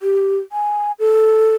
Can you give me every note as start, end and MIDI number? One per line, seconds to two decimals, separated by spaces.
0.02 0.38 67
0.52 0.92 80
0.99 1.55 69